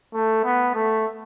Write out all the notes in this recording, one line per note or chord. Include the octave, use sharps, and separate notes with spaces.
A3
B3
A3